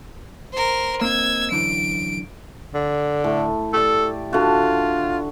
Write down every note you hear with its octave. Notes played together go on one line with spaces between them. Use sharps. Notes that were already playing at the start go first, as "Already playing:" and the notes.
A#4 C5
A#3 C4 D#4 E6 G#6
F#2 D3 E3 D7
D3
A2
G4 A4 D5
D3 F4 F#4